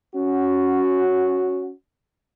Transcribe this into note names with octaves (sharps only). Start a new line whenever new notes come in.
C#4 F#4